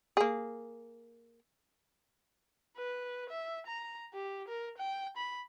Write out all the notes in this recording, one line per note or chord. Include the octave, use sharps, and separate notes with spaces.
A#3 G#4
B4
E5
A#5
G4
A#4
G5
B5